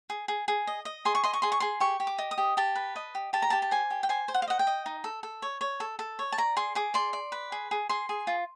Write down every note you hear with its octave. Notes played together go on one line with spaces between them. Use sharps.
G#4
G#4
G#4
D#5
D#5
G#4 C6
C#6
D#5 C6
C#6
G#4 C6
C#6
G#4 C6
G4 C#6
G4
D6
D#5
D#6
G4
G4 A5
B4
D#5
G4
G4 A5
A#5
G4 A5
A5
C5 G#5
G4
G5
C5 G#5
C5
F#5
F5
D#5 F#5
G5
D#5
D#4
A4
A4
C#5
C#5
A4
A4
C#5
A5
D5 A#5
G#4 C6
G#4 D6
D5 C6
D5
B4
G#4
G#4
G#4 C6
G#4
F4